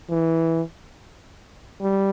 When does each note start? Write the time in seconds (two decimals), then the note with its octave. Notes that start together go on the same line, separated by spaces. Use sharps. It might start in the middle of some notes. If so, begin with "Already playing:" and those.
0.09 E3
1.81 G3